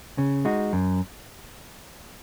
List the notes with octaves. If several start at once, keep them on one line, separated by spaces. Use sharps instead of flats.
C#3
G#3 D#4 F#4
F#2